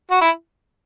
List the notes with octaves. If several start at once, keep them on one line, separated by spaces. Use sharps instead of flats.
F#4
E4